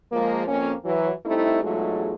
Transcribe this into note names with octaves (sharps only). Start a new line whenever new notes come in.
F3 G#3 A#3
F2 A#3 C#4
E3 F#3
G3 A3 C4 D#4 E4
E2 G#2 F#3 G#3 A3 F4